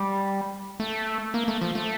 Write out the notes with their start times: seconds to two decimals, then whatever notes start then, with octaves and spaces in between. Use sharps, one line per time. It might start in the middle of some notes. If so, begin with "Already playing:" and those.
Already playing: G3
0.80 A3
1.34 A#3
1.48 A3
1.62 F3
1.75 A3